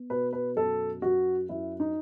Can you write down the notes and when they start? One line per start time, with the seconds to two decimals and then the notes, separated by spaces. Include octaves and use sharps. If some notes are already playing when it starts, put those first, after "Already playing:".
Already playing: B3
0.10 B2 B4
0.33 B4
0.56 F#2 A4
1.02 F#2 F#4
1.49 F#2 E4
1.80 D#4